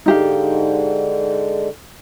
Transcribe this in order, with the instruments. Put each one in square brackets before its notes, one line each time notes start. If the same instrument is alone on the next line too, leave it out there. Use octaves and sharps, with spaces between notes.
[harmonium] G#2 D3 [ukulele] D#4 G4 F5